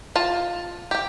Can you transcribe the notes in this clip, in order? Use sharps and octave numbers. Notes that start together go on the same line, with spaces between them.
F4 A5
G4 G5